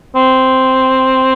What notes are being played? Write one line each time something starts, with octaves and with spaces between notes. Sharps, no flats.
C4